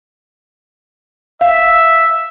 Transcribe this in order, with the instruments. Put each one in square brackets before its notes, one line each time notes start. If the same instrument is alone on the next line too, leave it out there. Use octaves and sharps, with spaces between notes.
[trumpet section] E5 [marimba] F5